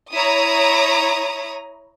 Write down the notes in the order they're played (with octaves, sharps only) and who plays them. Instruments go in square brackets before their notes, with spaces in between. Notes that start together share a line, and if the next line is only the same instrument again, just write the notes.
[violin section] E4 C#5 A#5 D#6